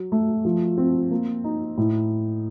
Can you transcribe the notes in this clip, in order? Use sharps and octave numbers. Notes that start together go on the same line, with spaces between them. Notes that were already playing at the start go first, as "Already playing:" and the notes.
Already playing: F#3
A3
F3
C4
A#3
D#4
A2